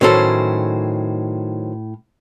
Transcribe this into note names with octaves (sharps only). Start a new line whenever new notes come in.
A2 D#3 F#3 C#4 A4 C5